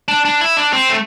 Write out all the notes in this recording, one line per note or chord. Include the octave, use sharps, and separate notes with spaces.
D4
D4
E4
D4
C4
A3